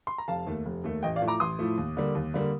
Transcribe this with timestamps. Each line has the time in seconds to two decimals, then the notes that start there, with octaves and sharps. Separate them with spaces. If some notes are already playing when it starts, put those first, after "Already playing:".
0.07 C6
0.18 A#5
0.28 F1 F5 A5
0.47 D#2 D#3 A3
0.66 F1
0.84 D#2 D#3 A3
1.03 A1 D#5 G5
1.16 D5 F5
1.22 A2 F3 A3
1.28 A#5 D6
1.40 A1 C6 D#6
1.59 A2 F3 A3
1.78 D#2
1.97 D3 G3 A#3
2.15 D#2
2.34 D3 G3 A#3